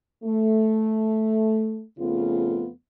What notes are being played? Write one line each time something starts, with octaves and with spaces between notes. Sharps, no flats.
A3
F2 C#3 A3 B3 F4